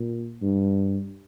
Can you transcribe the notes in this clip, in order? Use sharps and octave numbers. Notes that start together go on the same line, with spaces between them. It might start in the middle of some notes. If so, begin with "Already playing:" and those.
Already playing: A#2
G2